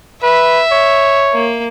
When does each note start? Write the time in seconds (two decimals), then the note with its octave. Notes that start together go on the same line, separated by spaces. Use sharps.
0.23 B4 E5
0.72 C#5
1.33 A#3